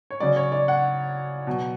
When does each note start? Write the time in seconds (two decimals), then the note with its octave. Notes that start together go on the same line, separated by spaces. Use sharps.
0.10 C#5
0.20 C#3 F#3 D5
0.36 C#5
0.52 D5
0.68 F#5
1.47 B2 F#3